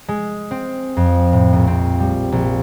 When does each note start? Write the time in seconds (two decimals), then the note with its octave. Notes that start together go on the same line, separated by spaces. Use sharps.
0.08 G#3
0.51 C4
0.97 F2
1.33 A2
1.53 A#1
1.67 C4
2.00 G3
2.32 A#1